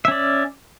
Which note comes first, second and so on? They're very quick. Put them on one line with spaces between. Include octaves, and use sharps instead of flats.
E5 C#4 D5